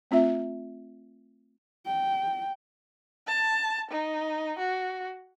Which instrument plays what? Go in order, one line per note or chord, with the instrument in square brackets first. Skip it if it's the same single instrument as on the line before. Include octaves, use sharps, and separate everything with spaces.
[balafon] A3 C4 F4 E5
[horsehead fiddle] G5
[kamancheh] A5
D#4
F#4